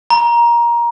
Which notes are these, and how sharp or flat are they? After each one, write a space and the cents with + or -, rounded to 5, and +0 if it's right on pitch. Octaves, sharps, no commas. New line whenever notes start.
A#5 +20